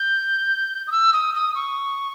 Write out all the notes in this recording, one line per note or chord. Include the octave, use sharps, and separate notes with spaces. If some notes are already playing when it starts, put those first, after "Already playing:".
Already playing: G6
D#6
E6
D#6
D#6
C#6